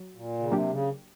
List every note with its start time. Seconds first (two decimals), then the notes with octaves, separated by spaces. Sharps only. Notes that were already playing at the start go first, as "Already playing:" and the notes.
Already playing: F#3
0.15 A#2
0.39 C#3
0.51 C3 F#3 A#3 D4 G4
0.70 C#3